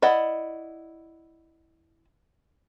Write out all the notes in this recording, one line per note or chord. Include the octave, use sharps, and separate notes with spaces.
E4 D5 D#5 F#5